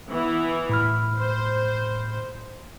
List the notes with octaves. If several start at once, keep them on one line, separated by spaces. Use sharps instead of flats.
E3 B3 E4
A2 B5 F6
C5